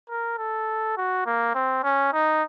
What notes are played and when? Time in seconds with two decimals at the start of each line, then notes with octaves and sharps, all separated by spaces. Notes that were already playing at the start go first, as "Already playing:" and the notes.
0.10 A#4
0.38 A4
0.97 F#4
1.26 A#3
1.55 C4
1.83 C#4
2.13 D#4